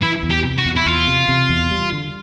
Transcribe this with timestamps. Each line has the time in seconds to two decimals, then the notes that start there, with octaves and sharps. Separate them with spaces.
0.02 E3 E4
0.23 E2
0.30 G4
0.44 C3
0.58 F#4
0.65 E2
0.76 E4
0.86 E2 F4
1.08 C3
1.29 C3
1.49 E2
1.71 G3
1.92 D3